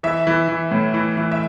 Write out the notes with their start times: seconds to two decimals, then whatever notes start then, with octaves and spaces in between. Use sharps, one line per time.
0.03 E3 E5
0.27 E3
0.48 E3
0.71 A2
0.94 E3
1.17 E3
1.32 E5